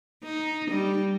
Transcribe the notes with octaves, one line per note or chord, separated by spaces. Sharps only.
D#4
G3